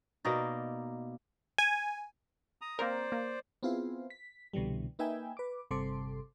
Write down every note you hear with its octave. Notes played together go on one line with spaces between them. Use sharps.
B2 A#3 D#4 D5
G#5
A#5 D#6
A#3 C4 A#4 C5 D5
A#3
B3 C4 E4 F4 G#4 C5
B6
C2 B2 D3 E3 G3
A#3 D#4 B4 E5 G5 G#5
B4 D6
G1 C3 G3 A4 C6 D6